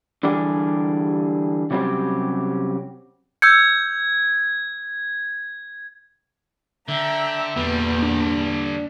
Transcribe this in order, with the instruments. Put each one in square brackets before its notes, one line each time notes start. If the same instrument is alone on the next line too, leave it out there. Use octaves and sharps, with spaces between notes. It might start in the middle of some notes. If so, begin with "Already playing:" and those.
[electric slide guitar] D3 E3 G3 D4 G4 G#4
C3 F#3 G3 C4 C#4 G4
[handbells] E6 G6 C#7 [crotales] G#6
[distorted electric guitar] D3 [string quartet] E5 G5 A#5 [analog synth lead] G6
[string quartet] E2 A#2 [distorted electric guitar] D3 G3 [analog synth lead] B3
[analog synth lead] D4